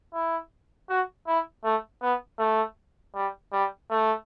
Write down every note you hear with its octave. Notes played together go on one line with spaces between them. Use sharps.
E4
F#4
E4
A3
B3
A3
G3
G3
A3